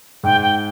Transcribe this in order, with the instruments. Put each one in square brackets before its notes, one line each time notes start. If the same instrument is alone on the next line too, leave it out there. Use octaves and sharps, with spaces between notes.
[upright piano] G#2 [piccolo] G5
[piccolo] G5